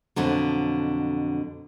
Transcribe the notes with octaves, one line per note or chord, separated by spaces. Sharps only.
F2 B2 D3 F#3